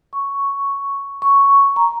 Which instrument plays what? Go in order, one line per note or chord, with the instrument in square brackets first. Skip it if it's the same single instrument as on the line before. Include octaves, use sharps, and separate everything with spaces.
[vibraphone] C#6
C#6
A#5